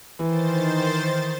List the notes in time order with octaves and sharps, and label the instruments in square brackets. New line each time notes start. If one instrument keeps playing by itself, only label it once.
[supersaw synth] D#3 C5 A6 [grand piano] E3